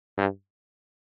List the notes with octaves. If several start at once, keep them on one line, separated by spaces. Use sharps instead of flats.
G2